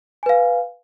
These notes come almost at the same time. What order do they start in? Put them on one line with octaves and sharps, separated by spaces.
G#5 B4 F5